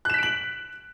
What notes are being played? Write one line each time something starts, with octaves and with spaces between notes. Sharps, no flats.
F#6 B6 D7 E7 F#7